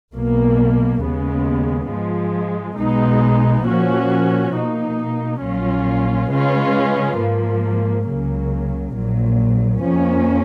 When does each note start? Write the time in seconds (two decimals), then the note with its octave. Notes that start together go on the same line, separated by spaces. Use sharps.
0.14 B1 B2 A#3
1.02 D#2 C#3 G#3 B3
1.90 G#2 F3 G#3
2.77 B1 B2 G#3 B3 D#4
3.66 A#2 F3 A#3 C#4 F#4
4.54 B2 A#3 D#4
5.42 A#1 A#2 F#3 C#4 F4
6.30 C#3 G#3 C#4 F4 B4
7.18 G#2 F3 A#3
8.06 C#2 C#3 F#3 A#3
8.94 A#1 A#2 F#3
9.82 F2 F3 A#3 C#4